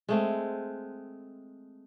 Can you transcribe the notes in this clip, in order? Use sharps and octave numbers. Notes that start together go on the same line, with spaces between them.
G#3 A3 C4